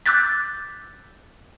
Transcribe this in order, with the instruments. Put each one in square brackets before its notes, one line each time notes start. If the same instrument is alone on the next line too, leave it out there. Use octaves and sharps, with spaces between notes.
[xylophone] D6 E6 F#6 G6 A6 B6